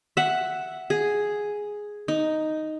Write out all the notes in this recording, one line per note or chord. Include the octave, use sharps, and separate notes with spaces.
E5 F#5
G#4
D#4